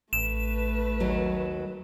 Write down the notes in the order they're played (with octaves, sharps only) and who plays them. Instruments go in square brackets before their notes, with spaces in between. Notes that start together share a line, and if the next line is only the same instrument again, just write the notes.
[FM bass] A1 [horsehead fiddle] A3 B4 [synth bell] E7
[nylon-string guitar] D#2 F#3